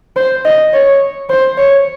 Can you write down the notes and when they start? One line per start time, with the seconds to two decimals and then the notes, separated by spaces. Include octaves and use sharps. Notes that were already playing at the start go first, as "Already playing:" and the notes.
0.16 C5
0.45 D#5
0.73 C#5
1.30 C5
1.58 C#5